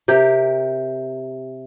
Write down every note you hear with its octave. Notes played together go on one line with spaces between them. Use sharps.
C3 G4 A#4